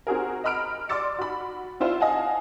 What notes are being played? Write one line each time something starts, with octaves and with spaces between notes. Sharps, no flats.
C4 F#4 G#4 A#4
D#5 A#5 B5 F6 D7
D5 C6 D6 E6 A6 C#7
F#4 B5
C4 E4 F4 C5
D#5 F5 F#5 G#5 A5